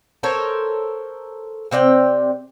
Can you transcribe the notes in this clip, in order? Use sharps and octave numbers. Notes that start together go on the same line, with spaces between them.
A4 A#4 C5 C#5
C3 C4 D5 G5